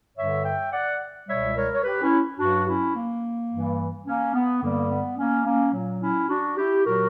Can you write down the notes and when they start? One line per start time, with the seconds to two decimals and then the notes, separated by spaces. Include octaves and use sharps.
0.17 G2 D3 G3 C#5 E5
0.44 E5 G5
0.72 D5 F#5
1.28 C#2 B2 G3 C#5 E5
1.56 A#4 C#5
1.73 C#5
1.83 G4 B4
2.02 C#4 E4
2.39 G2 F#3 D4 F#4
2.67 C#4 E4
2.95 A#3
3.51 G2 E3 G3
4.07 A#3 C#4
4.35 B3
4.62 G2 D3 G3 A#3
4.90 B3
5.17 A#3 C#4
5.45 A#3 C#4
5.73 A#2 F#3
6.01 C#4 E4
6.29 D4 F#4
6.57 E4 G4
6.85 A#2 F#3 F#4 A#4